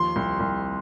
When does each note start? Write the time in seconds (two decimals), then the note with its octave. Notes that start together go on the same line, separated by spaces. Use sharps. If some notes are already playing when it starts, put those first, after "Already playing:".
Already playing: D#2 F3 C6
0.16 C2
0.40 C2